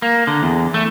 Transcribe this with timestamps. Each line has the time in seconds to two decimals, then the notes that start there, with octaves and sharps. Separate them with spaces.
0.02 A#3
0.27 D3
0.43 E2
0.74 A3